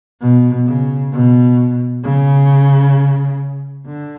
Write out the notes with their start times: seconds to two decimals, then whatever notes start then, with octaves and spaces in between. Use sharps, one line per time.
0.21 B2
0.66 C#3
1.12 B2
2.04 C#3
3.86 D3